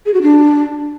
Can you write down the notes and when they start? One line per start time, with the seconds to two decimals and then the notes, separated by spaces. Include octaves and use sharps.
0.06 G#4
0.14 F#4
0.22 D4